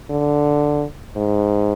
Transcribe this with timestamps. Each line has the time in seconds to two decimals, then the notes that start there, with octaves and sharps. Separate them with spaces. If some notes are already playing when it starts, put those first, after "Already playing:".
0.10 D3
1.16 G#2